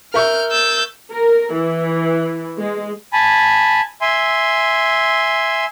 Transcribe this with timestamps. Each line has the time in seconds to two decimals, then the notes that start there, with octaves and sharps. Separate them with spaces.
0.14 A#4 E5 C#6 F6 G6
0.51 E6 G6 A6
1.12 A#4
1.53 E3
2.59 G#3
3.13 G#5 A5 B5
4.01 E5 G#5 C6